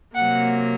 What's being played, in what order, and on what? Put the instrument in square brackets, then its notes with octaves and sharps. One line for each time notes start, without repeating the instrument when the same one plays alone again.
[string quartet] C3 F#3 A#3 F#5